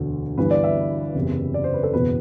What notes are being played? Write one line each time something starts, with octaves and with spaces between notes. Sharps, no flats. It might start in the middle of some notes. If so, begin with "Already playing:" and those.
Already playing: E1 D2 D3
G1 G2 E3 B4
D5
E5
F#1 E2 C3
D5
C5
B4
A4
F#1 E2 B2 B4